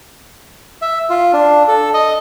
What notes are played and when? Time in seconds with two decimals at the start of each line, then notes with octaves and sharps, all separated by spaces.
0.82 E5
1.10 F4
1.33 D4
1.68 A4
1.94 D#5